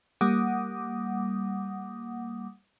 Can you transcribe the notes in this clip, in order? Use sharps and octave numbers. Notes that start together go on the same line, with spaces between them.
G3 A#3 F#5 D6 D#6